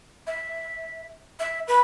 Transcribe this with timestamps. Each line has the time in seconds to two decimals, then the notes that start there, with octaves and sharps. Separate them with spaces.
0.27 E5
1.40 E5
1.68 B4